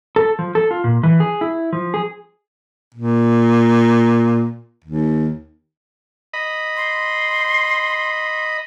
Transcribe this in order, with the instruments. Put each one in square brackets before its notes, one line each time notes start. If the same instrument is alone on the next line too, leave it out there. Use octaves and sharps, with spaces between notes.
[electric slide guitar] A4
F3
A4
F4
A#2
E3
G#4
E4
F3
G#4
[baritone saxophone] A#2
D#2
[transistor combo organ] D#5 B5
[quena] C6